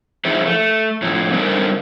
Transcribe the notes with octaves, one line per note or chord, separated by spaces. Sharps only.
F3 D#4 E4 G#4 C5
A3
A2 D3 F3
D3 G3 D#4 A#4 C5